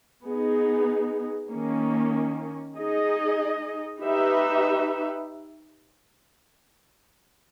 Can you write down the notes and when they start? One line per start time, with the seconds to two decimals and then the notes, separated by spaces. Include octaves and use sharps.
0.25 B3 D#4 G#4
1.50 D#3 A#3 C#4
2.77 D#4 G#4 D#5
4.02 D#4 G4 B4 E5